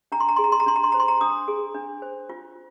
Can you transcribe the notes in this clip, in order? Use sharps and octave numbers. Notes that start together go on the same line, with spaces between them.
D4 A#5
C6
A#5
G#4 C6
A#5
C6
A#5
D4 C6
A#5
C6
C5 A#5
C6
A#5
D4 D#6
G#4
D4
C5
F4